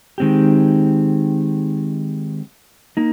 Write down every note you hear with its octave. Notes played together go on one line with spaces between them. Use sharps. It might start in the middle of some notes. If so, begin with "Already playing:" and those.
D#3 G#3 C4 G4
A#3 D#4